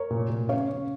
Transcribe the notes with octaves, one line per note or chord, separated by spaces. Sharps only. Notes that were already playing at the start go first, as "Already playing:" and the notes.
Already playing: A#4 C#5
A#2
A#2
C#3 C#5 F5
C#3